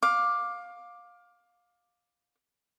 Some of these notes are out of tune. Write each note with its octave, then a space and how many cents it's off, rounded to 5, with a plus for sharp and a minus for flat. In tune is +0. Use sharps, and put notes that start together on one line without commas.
F5 +20 D6 +5